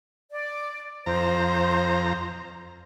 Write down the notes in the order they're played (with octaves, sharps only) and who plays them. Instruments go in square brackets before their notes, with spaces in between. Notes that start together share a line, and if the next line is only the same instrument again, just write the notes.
[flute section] D5
[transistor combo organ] F2 A#5 [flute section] C5